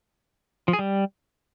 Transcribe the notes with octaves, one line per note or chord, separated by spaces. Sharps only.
F3
G#4
G3